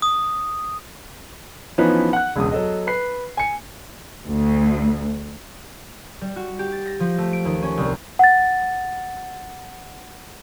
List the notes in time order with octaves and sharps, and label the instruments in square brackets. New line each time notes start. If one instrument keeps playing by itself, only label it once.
[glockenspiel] D#6
[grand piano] E3 F3 B3 C#4 D#4 B4
F#5 F#6
E1 C#2 D#6
F#3 A4 D#5
B4 C7
G#5 C#7
[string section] D2
[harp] G3
F#4
G4
A6
A#6
F3
A3
D7
D#2
C#4
C2
[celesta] F#5 A6